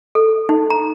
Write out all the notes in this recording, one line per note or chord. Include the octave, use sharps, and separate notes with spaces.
A4
D#4
A#5